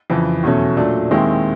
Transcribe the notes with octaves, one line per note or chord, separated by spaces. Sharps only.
F2 C#3 E3
E2 B2 F#3 A3 C#4
A#2 F#3 A3 D4
D#2 D#3 G#3 C4 E4